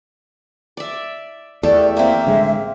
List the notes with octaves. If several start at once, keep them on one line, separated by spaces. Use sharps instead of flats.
D5 E5
E2 A3 G4 D5
A#3 C4 E5
A1 D3 G#3